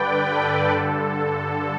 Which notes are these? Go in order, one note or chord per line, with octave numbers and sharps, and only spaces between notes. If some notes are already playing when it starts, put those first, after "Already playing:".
Already playing: G2 D3 B4 D5 G5
A4
G2 D3 A4
A4